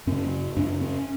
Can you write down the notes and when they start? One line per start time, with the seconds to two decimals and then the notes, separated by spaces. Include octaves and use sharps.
0.07 F#2 C#3 C#4
0.57 F#2 C#3 D4
0.81 C#4